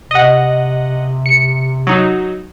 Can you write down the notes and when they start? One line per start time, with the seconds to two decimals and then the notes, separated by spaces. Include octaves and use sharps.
0.11 C3 D#5 F#5
1.26 C#7
1.87 F#3 D#4